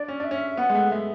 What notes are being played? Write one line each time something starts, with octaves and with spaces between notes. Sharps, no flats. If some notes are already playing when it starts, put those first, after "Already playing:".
Already playing: D4 D5
C#4
D4 E5
C#4
B3 F#5
G#3
A3
G#3 E5